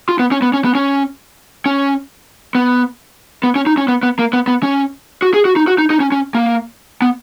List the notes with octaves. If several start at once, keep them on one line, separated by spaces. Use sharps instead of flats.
F4
B3
C#4
B3
C#4
B3
C#4
C#4
B3
B3
C#4
D#4
C#4
B3
B3
A#3
B3
B3
C#4
F#4
G#4
F#4
D#4
F#4
D#4
D#4
C#4
C#4
A#3
B3